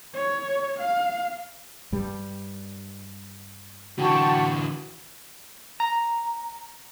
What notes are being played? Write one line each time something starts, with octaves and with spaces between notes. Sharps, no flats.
C#5
F5
G2 G3
D3 E3 F#4 G5 A5 C#6
A#5